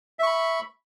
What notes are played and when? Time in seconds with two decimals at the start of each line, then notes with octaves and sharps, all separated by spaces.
0.19 E5
0.23 C#6
0.27 B5